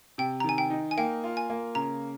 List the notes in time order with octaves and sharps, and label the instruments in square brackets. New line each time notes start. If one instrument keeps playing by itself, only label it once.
[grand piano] C3 [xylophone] G5
[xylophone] A#5
[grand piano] D#3 [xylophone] G#5
[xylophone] G5
[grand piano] D#4
[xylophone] G#5
[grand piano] A#3 [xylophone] G5
[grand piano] F4
[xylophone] G#5
[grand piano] A#3
[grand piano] C#3 [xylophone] A#5